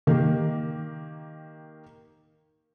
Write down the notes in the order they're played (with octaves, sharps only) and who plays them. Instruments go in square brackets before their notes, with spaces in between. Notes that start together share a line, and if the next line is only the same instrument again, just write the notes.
[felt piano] D#3 A#3 G4